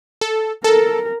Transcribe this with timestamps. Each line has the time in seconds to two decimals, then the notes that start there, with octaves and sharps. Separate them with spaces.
0.21 A4
0.64 A4 A#4